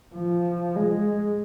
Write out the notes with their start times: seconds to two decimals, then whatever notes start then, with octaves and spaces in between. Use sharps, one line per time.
0.15 F3
0.75 G#3